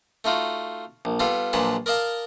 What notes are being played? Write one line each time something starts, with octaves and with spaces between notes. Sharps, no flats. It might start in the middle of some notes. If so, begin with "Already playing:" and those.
A3 D#4 F4 F#4
A#1
G3 B3 F4 A4 F5
A#1 A#2 F#3 G#3 B4 A5
A#4 D5 D#5 F5 A5 A#5